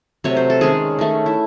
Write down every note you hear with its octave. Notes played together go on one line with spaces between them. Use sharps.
C3 F#3 A3 C#5
C5
A4
D#3 G#3 C#4 G#4
D#3 A3 C#4
E4